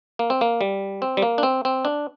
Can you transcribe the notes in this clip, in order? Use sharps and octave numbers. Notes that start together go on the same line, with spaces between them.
A#3
C4
A#3
G3
C4
G3
A#3
D4
C4
C4
D4